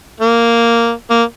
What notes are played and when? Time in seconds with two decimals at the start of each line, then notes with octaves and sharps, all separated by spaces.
0.20 A#3
1.10 A#3